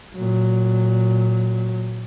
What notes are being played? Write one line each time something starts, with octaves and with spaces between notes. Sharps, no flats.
A#2 F#3